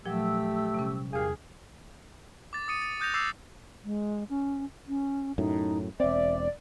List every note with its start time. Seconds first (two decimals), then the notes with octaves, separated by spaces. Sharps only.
0.05 A#2 F3 F#3 A3 G4 E6
0.74 C3 G3 C#4
1.13 E2 G4 G#4 A#4 F5 F6
2.53 D6 A6
2.68 D#6 C#7 D#7
2.82 A6
3.00 D#6 F#6 G6 A6 A#6 F7
3.14 D6 E6 A6 C7
3.85 G#3
4.29 C#4
4.88 C#4
5.38 F#2 A2 D#4
6.00 E1 C4 D5 E5